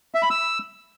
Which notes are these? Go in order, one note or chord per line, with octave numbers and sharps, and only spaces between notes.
E5
B5
E6